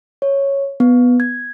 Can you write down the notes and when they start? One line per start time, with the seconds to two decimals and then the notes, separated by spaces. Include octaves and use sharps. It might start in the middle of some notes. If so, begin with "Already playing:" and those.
0.22 C#5
0.80 B3
1.20 G#6